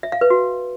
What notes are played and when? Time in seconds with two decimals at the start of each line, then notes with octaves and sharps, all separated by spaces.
0.03 E5
0.12 F5
0.21 B4
0.30 F#4